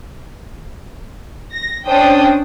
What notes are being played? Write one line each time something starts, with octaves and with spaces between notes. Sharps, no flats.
A#6
C#4 D4 C5 G5 D#6